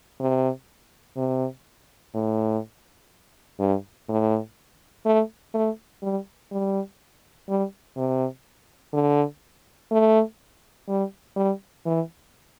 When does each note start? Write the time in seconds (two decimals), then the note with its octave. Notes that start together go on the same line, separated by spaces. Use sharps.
0.20 C3
1.17 C3
2.14 A2
3.59 G2
4.09 A2
5.06 A3
5.54 A3
6.03 G3
6.51 G3
7.49 G3
7.96 C3
8.93 D3
9.91 A3
10.88 G3
11.36 G3
11.86 E3